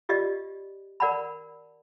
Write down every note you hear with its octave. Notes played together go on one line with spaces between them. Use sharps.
F4 G4 D5 D#5
A#4 D5 F#5 A5 B5